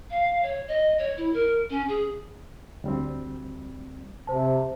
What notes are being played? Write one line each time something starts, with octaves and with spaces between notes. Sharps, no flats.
F5
C#5
D#5
C#5
E4
A#4
C#4
G#4
D2 G3 C4
C3 C5 A5